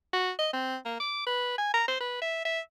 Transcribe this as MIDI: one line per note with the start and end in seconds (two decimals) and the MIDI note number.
0.13 0.31 66
0.39 0.51 75
0.53 0.76 60
0.85 0.99 58
1.00 1.26 86
1.27 1.53 71
1.58 1.72 80
1.74 1.85 82
1.88 1.98 72
2.00 2.18 71
2.21 2.42 76
2.45 2.60 76